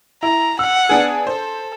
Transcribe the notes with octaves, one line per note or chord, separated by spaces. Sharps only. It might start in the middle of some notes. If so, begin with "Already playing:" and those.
E4 A#5
F#5 E6
B3 D4 G#4
A4 C5